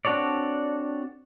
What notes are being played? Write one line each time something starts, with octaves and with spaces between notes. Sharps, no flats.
C4 D4 F#4 A4 C#5 D5